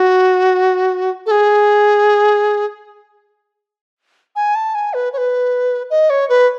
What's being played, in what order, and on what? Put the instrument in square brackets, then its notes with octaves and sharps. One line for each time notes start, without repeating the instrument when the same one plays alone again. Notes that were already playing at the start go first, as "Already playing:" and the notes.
Already playing: [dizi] F#4
A4
G#4
G#5
A5
G#5
B4
C#5
B4
D#5
C#5
B4